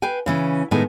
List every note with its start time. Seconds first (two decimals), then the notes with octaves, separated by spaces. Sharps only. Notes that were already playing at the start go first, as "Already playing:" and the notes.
0.02 B4 F5 G5 G#5
0.26 C#3 E3 C#4
0.71 A2 D#3 G#3 B3 G#5